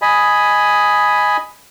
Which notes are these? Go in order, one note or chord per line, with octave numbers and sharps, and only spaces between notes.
D#5 G#5 B5